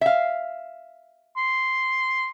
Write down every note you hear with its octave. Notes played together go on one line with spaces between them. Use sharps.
E5 F5
C6